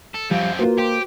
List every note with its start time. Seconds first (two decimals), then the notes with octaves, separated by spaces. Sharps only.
0.15 A4
0.31 F#2 F3 G3 C4 F5
0.59 A#3 F4 F#4 B4 C5
0.79 G4 C5